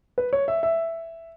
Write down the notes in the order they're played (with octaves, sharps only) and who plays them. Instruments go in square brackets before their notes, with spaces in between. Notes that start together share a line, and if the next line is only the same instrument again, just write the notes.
[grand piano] B4
C#5
E5
E5